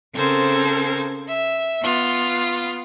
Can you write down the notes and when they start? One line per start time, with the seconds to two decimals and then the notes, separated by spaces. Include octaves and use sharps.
0.15 C#3 C4 A4 A#4 C5 G#6
1.28 E5
1.83 B3 F4